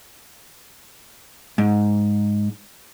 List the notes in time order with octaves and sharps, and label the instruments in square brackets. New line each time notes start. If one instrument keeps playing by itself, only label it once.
[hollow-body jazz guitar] G#2